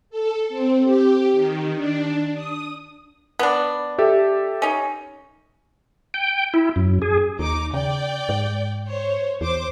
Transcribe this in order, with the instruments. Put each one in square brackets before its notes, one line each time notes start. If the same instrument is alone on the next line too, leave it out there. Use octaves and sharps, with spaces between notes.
[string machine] A4
C4
G4
D#3
D4
D#6
[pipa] B3 D4 [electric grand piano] B5
[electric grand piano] G4 A4 E5
[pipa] C#4 D#4
[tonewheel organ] G5
E4
F#2
G#4
[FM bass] D#2 [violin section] D#4 D6
[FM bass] C#3 [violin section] D5 G5
[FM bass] G#2
[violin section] C5 C#5
[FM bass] E2 [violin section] C5 D6